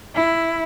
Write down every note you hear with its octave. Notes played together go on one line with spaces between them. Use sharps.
E4